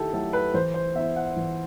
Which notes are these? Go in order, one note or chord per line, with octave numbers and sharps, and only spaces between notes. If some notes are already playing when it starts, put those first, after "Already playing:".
Already playing: D#3 A3 E4 G4 A4
F#3 A3 E4 A4
B4
E3 C5
C5
B3 E4 E5
F#5
E3